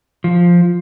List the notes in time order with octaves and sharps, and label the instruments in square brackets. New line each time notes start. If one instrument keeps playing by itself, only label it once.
[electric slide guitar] F3